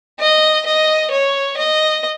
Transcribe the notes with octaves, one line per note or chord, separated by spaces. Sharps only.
D#5
D#5
C#5
D#5